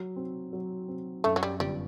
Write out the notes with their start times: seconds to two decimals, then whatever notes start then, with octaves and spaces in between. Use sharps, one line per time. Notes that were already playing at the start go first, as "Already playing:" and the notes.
Already playing: F#3
0.16 C4
0.53 F#3
0.88 C4
1.24 F#2 A3
1.36 F#3
1.43 G3
1.60 G1 G3